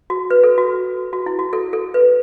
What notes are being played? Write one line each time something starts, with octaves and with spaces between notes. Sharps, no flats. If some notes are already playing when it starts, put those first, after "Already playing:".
F#4
B4
A4
F#4
F#4
E4
F#4
A4
A4
B4